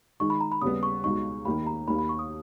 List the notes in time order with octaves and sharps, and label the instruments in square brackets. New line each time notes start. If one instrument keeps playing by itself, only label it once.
[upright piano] D#3 G#3 D#4 [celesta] C#6
[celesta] B5
A#5
B5
[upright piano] D#2 C#3 G3 B3 [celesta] D#6
[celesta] C#6
[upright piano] C#2 B2 G#3 D#4 [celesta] C#6
[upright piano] D#2 D#3 A#3 D#4 G4 [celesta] B5
[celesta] A#5
[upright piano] D#2 D#3 A#3 [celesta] B5
[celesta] B5
C#6
D#6